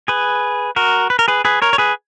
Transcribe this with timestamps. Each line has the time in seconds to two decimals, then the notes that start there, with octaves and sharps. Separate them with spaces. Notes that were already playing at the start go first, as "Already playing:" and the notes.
0.08 G#4 B4
0.76 F#4 A#4
1.10 B4
1.19 A#4
1.28 G#4 B4
1.45 G#4 B4
1.62 A#4 C#5
1.73 C#5
1.78 G#4 B4